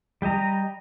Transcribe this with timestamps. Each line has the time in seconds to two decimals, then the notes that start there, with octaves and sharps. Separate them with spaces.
0.22 G3 G4 D#5 A#5